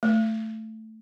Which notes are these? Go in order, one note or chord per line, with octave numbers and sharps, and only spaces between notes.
A3